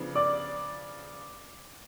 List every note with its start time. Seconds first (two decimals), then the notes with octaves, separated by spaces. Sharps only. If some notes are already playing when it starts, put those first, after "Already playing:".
Already playing: C#3 F3 B3 D4
0.15 D5 D6